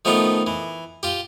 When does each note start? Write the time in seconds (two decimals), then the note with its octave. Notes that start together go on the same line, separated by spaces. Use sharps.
0.05 D#3 F3 A3 B3 D#4 F4
0.47 E3
1.03 F4 G4